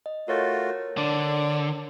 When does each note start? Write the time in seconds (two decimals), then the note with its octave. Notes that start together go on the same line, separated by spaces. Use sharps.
0.06 D#5
0.28 A3 F4 F#4 A#4 C#5 A6
0.98 D3 D5